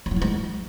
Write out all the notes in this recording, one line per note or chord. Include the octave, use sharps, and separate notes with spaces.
C4
F#3
E4
G#3